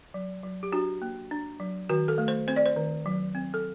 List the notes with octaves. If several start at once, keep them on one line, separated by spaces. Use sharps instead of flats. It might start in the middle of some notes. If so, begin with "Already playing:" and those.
F#3
F#3
G4
D4 F#4
A#3
D4
F#3
D#3 F#4
A4
A3
C5
C4 C5
D5
C5
D#3
F#3
C4
A4